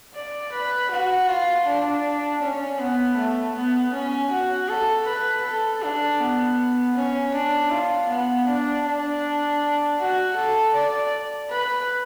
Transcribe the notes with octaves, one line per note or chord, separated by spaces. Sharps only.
D5
B4
F#4
F4
D4
C#4
B3
A3
B3
C#4
F#4
A4
B4
A4
D4
B3
C#4
D4
F4
B3
D4
D4
F#4
A4
D5
B4